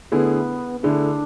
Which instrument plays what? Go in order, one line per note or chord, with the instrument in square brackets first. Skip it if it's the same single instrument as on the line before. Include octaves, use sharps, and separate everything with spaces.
[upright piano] D3 A3 E4 G#4 [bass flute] B3
[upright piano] D3 A3 E4 G#4 [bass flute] D4